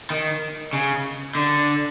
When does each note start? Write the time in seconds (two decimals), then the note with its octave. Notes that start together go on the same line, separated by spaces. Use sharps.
0.10 D#3
0.73 C#3
1.35 D3